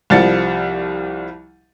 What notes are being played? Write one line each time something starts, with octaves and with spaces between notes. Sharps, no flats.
C2 F3 G3 A6 C#7